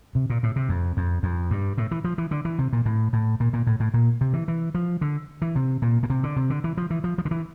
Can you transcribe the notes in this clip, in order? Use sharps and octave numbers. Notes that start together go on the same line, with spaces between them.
C3
A#2
A2
C3
F2
F2
F2
G2
A2
E3
F3
E3
D3
E3
C3
A#2
A2
A2
A#2
A#2
A2
A2
A#2
C3
E3
E3
F3
D3
E3
C3
A#2
A#2
C3
D3
C3
D3
E3
F3
E3
F3
F3
D3
E3